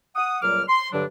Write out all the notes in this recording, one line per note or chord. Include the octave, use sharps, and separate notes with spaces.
F#5 D#6
C#2 A#2 F#3 G3 D6 F6
C6
G2 D3 F#3 D4